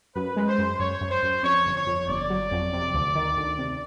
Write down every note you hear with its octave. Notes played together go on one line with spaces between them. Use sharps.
F#2 B4
G#3
C5
F#2
F#2 C#5
F#2
C5
F#2
F2 C#5
G1
C#5
F2
G1 D5
F#3
F2
C3
D2
D#3
D2
C3